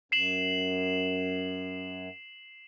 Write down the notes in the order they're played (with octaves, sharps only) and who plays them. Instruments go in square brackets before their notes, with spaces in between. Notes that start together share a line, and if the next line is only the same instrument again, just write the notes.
[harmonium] F#2 [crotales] C7 E7 F#7